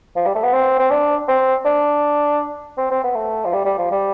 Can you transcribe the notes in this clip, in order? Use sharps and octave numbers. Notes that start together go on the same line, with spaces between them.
F3
G3
A3
B3
C4
C4
D4
C4
D4
C4
C4
B3
A3
F3
G3
G3
F3
G3